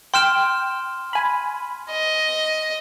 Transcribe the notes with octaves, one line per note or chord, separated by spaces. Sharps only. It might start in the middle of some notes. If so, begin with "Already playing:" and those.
G5 C6 F6 E7
G#5 B5
D#5